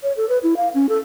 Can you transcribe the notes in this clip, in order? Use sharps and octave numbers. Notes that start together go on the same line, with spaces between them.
C#5
A4
B4
E4
F5
C#4
A4